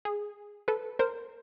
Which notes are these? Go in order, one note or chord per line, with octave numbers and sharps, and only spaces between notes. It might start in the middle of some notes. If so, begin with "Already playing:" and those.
G#4
A4 B4
A#4 C5